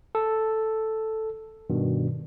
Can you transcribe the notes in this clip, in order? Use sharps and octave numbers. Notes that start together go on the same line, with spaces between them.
A4
G2 B2 D#3